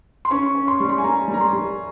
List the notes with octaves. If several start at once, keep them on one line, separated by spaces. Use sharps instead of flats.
C6
C#4 C#6
C#4
C6
G3 C#6
C6
G#5
G3 A#5
G3
A#5
C6
G3